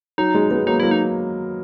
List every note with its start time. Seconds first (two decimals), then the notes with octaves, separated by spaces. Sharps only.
0.18 F#3 D#4
0.35 G#3
0.51 G#3 B3
0.67 F#3 A#3 D#4
0.80 F#3 A#3 E4
0.91 D#4